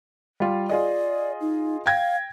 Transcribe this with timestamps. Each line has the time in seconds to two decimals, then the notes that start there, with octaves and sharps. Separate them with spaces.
0.40 G3 F4
0.69 F4 G#4 D5 D#5
1.41 D#4
1.86 F5 G5 G#6 A#6